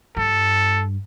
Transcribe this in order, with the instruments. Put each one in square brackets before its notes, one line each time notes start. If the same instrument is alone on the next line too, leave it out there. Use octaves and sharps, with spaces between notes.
[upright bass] G2 [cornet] A4